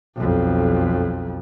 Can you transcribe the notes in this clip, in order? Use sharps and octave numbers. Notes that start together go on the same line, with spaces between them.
B1 F2